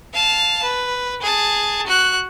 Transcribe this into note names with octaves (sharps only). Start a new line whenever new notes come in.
F5 A5
B4
G#4 A5
F#4 F#6